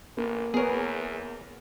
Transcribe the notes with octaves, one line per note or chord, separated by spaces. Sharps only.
A1 A#3
E2 B3 G#4 A#4 C#5